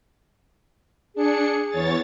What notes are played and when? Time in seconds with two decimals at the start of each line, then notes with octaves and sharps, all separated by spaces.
1.15 D4 G#4 C#7
1.69 E2 C#5 A6